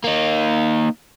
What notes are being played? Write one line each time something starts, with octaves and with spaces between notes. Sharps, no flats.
A#3 D#4